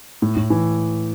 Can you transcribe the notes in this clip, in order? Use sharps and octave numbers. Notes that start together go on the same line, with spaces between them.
A2
A2
E3